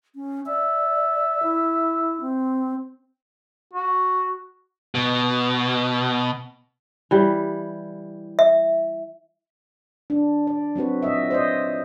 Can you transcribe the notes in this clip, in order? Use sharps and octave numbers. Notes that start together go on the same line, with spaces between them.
C#4
D5 E5
E4
C4
F#4
B2
E3 G3
E5
D4
D5
F#3 C4 F#4 B4
A#2 F#3 D#5 E5
C5 D5 D#5